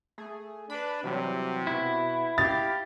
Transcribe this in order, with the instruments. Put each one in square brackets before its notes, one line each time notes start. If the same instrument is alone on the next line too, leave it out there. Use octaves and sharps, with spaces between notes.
[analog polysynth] A3 G#4
[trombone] D4 [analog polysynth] B4 B5
[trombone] C3 [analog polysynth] E3 F#3 G3
[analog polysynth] B2 B3 F#4 [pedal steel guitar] E4
[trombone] G4 [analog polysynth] F5 [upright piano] A6